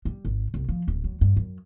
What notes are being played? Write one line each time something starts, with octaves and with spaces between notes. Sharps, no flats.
G3
G#1
C2
F3
D1
F#3
G2
F#2